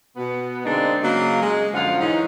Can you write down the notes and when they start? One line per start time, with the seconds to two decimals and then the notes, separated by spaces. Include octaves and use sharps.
0.16 B2 B3
0.65 D3 G#3 A#3 C4 D4 D#4
1.02 C#3 F#3 G#3 A#3
1.42 G#3
1.74 F#2 D3 F3 F4 F5 F#5
2.00 G#2 E3 A#3 C#4 D#4